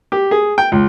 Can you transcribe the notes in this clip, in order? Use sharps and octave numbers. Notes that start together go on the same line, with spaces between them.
G4
G#4
G5
C#2